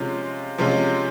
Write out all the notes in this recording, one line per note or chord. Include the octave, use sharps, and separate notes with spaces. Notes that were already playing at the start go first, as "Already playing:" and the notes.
Already playing: C3 F3 G#3 C#4 F4
C3 F3 G#3 C#4 F4